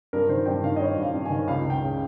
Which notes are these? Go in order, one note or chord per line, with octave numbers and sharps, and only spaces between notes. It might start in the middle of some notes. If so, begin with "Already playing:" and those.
G2 A#4
D#3 C5
G2 G5
D#3 F5
D#5
G2 C#5
G2
F5
G2
D#3 G#5
C#2 F5
C#2
G5
C#3